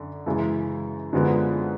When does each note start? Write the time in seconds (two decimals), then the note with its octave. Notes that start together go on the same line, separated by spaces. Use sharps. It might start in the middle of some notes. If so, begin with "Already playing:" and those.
Already playing: F#2 D3
0.26 F#2 C#3 E3 G#3
1.13 F#2 D3 F3 G#3 B3